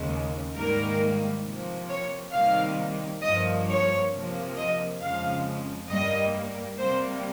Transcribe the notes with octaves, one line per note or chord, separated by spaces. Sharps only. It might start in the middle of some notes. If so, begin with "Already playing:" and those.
Already playing: D#2 C#3 G#3
G#2 D#3 G3 A#3 A#4
C3 F3 A#3
C#5
C3 D#3 G3 A#3 F5
G2 F3 A#3 D#5
C#5
C3 F3 A#3
D#5
F2 C#3 F3 G#3 F5
G2 G3 A#3 D#5
C3 G3 A#3 C5